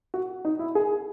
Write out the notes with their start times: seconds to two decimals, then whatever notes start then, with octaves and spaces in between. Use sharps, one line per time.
0.14 F#4
0.45 D#4
0.59 E4
0.75 G#4